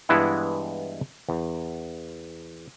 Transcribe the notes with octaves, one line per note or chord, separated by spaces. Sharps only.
G2 E3 G#3 B3 E4 F#5
E2